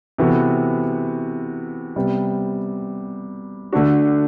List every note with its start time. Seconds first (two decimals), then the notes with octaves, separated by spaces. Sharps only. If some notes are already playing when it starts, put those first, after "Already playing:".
0.18 C3 E3 B3 F#4 A4
1.96 C3 G3 B3
3.73 D3 A3 D4 F#4